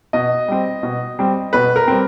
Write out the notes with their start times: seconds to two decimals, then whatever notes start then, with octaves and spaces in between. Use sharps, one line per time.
0.13 B2 D#5
0.48 G3 C4
0.83 B2
1.19 G3 C4
1.53 B2 B4
1.76 A#4
1.88 G3 C4